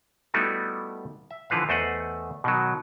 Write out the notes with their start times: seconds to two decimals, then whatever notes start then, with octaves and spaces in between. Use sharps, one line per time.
0.34 G3 A3 B3 D#4 E4 F#4
1.31 E5
1.50 D3 E3 F3 B4 F5
1.69 E2 A3 C5 D#5 F#5
2.44 B2 D#3 F#3